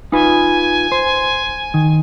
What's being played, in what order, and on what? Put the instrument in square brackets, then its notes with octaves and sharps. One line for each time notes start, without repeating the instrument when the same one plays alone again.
[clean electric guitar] D#4 F4 B4 [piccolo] G#5
[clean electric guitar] C5
D#3